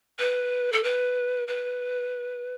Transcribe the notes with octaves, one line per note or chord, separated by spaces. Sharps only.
B4
A4
B4
B4